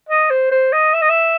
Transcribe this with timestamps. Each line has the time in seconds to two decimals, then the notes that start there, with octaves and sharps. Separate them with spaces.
0.09 D#5
0.30 C5
0.52 C5
0.73 D#5
0.94 E5
1.02 D#5
1.10 E5